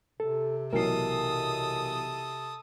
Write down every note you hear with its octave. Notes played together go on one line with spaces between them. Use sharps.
C3 A4
B1 E3 A4 A#4 D#6 C7